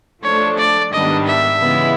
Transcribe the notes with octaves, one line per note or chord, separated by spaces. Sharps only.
F3 A3 D4 C#5
D5
G#2 D#3 G3 B3 D4 D#5
E5
C#3 E3 G#3 B3 E4